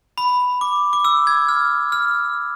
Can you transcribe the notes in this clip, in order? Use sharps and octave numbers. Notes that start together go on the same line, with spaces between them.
B5
D6
D6
E6
G#6
F6
F6